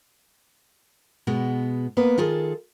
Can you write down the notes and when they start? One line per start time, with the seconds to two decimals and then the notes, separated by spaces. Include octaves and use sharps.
1.27 B2 G#3 B3
1.97 A#3 B3 B4
2.18 D#3 F4 G#4 A4